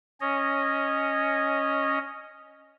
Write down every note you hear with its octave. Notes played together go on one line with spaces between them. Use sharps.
C#4 C#5 D#5